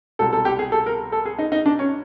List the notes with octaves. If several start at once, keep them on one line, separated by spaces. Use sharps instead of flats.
C2 B2 A4
A4
G4
G#4
A4
A#4
A4
G#4
D#4
D#4
D4
C#4